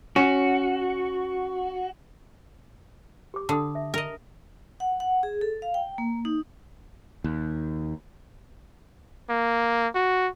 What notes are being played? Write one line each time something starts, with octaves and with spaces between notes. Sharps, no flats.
C#4 F#4
G4 D6
D3 A5 D6 D#6
E5
A#4 D#5
F#5
F#5
G#4
A4
F5
G5
A#3
D#4
D#2
A#3
F#4